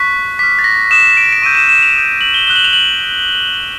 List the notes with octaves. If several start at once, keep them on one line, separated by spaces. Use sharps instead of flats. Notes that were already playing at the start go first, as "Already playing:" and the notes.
Already playing: C#6 F#6 B6
D6 F6 B6
A6
A#6
D#6 F#6 E7
D7
D7
C#6 E6 G6 D#7
E7
E7
F7
D#6 G6
F#7
G7
D#6 F#6 G7
F#7
F7
F#7